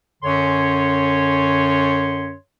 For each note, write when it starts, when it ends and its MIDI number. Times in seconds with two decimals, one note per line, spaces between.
0.23 2.34 42
0.23 2.34 50
0.23 2.34 61
0.23 2.34 73
0.23 2.34 84